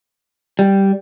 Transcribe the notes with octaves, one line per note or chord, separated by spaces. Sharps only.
G3